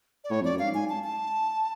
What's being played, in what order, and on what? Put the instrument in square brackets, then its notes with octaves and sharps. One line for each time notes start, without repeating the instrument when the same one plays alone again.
[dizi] D5
[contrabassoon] A2 [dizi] C#5
[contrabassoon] F2 [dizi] D5
[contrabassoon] F#2
[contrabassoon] G#2 [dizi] F5
[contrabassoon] G#2 [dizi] G#5
[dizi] A5
A5